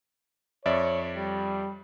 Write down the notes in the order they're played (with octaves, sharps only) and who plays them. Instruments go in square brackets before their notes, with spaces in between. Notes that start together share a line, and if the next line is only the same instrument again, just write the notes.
[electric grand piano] F2 D5 E5 [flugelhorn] C#5
[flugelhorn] G3